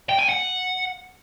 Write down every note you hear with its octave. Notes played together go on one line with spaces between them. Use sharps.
G5
G#5
F#5